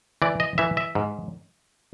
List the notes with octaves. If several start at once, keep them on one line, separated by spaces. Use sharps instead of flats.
E3 D5
D#5
E3 E5
E5
G#2